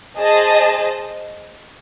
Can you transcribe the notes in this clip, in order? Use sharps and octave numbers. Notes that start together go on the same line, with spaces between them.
G#4 C5 D#5 A5